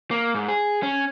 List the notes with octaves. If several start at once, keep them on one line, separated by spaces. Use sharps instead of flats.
A#3
G#2
G#4
C#4